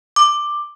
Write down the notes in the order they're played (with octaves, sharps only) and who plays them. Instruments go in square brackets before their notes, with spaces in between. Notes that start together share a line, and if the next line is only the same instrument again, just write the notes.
[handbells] D6